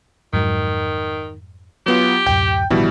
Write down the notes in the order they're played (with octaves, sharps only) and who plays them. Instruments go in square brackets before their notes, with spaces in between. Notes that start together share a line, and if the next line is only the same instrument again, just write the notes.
[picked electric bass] F2 G#2 F#3 [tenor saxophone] D#3
[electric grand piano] F#3 B3 F4 [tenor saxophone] G4
[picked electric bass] D1 F#2 [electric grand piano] G5 G6
[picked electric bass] A1 D#3 F3 [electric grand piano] B2 G3 E4